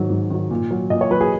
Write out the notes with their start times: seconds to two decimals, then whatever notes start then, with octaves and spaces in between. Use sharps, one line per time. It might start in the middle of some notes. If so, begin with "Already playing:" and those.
Already playing: G#2 D#3 F#3
0.10 G#2
0.30 D#3 F#3
0.51 A#2
0.71 F#3
0.90 A#2 D#5
1.01 C#5
1.11 F#3 B4
1.21 G#4